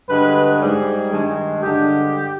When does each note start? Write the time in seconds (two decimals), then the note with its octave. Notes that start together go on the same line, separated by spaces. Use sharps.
0.08 G2 D3 G#3 B4
0.60 G#2 G3 G#4
1.11 G2 D#3 G#3
1.62 G2 D3 G#3 G4